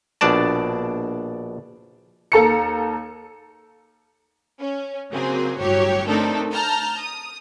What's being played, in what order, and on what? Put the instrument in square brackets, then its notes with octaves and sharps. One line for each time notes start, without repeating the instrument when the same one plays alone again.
[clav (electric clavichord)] A#1 B2 D4 D5 A5
[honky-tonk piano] D#2 A4 A#5 C#7
[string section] C#4
C#3 F#3 A#3 C4 G#4
G1 A2 F#3 F#4 G4 C#5
A3 C4 D4 D#4 A4 A#4
A5 A#5 F6 G6
D#6